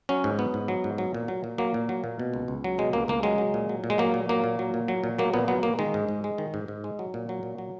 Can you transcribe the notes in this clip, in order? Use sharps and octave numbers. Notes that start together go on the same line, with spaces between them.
F#3 C#4
G#2
F#3 B3
G#2
F#3
G#2
F#3
A#2
F#3
A#2
F#3 A#3
A#2
F#3
A#2
B2
C#2
C#2
F#3
B2 G#3
C#2 A#3
C#2 A#3
F#3 G#3
F#3
A#2
F#3
A#2
G#3
F#3 A#3
A#2
F#3 A#3
A#2
F#3
A#2
F#3
A#2
F#3 A#3
A#2 B3
F#3 B3
A#2 A#3
D#3 G#3
G#2
G#2
G#3
D#3
G#2
G#2
G#3
F#3
A#2
F#3
A#2
F#3